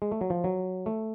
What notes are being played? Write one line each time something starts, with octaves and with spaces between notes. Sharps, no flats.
G#3
A3
F#3
F3
F#3
A3